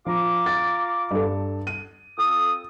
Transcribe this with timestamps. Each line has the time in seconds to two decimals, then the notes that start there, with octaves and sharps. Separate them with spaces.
0.06 F3 F4 A#5 D6
0.46 A6
1.11 G2 A4
1.67 D#7
2.18 F2 A4 D#6